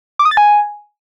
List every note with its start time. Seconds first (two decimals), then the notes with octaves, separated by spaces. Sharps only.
0.19 D6
0.25 D#6
0.31 A6
0.37 G#5